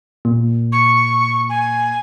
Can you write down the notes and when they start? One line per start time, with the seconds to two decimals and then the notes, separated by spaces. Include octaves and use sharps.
0.25 A#2
0.72 C#6
1.49 G#5